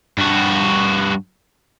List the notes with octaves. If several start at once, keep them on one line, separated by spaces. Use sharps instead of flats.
G2 F#4